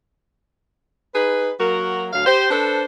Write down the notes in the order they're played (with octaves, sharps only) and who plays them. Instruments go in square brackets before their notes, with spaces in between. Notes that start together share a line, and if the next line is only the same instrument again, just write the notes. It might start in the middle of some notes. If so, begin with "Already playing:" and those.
[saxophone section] D#4 G#4 B4
F#3 A#3 F#4 A#4
D2 F#3 F5
G4 C5
D4 A4 B4 C5